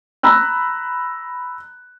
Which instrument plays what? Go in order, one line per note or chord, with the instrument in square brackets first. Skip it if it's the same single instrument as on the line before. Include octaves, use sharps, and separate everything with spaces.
[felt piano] A#5 B5 E6 F#6